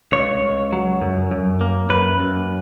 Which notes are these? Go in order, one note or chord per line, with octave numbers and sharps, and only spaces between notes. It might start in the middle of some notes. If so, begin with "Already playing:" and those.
C#2 C#5
C#2
F#3
F#2
F#2
A#3
F#2 B4
F#2